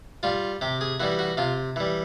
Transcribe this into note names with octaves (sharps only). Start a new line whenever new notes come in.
G3 F4
C3 G4
G#4
E3 G3 F#4
F#4
C3 F4
E3 G3